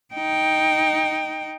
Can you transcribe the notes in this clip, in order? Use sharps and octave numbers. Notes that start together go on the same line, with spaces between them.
D#4 G5